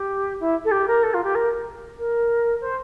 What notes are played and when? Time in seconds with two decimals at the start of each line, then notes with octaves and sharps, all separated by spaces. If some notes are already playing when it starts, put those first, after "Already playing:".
Already playing: G4
0.40 E4
0.65 A4
0.71 G4
0.88 A#4
1.03 A4
1.14 F4
1.24 G4
1.35 A#4
1.99 A#4
2.61 C5